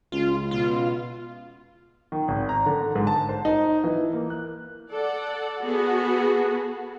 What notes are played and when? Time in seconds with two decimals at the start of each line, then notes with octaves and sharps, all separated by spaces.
0.12 C#2 F4
0.51 B2 F4
2.12 D#3
2.28 G#1
2.49 A#5
2.66 D3
2.95 G#2
3.07 A5
3.29 C5
3.45 D#4
3.84 E3
4.13 A#3
4.30 F#6
4.90 A4 D5 F#5
5.63 B3 F#4 G#4 A4